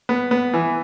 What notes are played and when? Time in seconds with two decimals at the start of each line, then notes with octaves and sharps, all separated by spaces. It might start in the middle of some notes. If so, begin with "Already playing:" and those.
0.09 B3
0.31 B3
0.54 E3